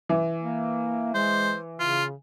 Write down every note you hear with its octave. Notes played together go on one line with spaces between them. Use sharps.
E3
A#3
G#3 C5
C#3 F4